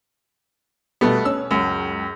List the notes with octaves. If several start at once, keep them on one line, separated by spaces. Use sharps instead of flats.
B2 G3 A3 B3
C#4 E6
C#2 F#2